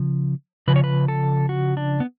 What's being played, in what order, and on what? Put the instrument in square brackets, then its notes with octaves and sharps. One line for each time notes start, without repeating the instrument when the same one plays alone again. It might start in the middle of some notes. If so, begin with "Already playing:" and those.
Already playing: [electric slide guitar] C#3 F3
C#3 F3 B4
C#5
B4
A4
F#4
D4
B3